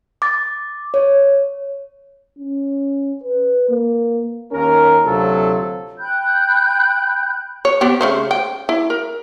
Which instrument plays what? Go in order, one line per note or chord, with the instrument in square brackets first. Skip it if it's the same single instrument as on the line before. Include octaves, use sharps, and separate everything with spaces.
[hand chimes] D6 A6
C#5
[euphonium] C#4
B4
A#3
[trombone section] D#2 C#4 A#4
D2 C3 F#3 F4 A4
[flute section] G5 B5 F#6 G6
[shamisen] C#5
B3 C4 G4
C#3 A3 C5
G5
E4
A#4